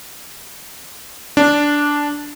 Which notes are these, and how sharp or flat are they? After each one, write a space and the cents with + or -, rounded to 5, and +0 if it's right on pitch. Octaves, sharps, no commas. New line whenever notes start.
D4 -10